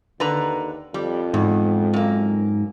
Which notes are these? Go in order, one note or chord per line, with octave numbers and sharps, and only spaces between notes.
D#2 D3 B4 A#5
F2 G3
E2 G#2
F#2 A#3